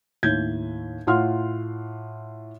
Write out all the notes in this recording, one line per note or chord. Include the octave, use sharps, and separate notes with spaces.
D#2 A2 G6 G#6
A2 F4 F#5 C6 F6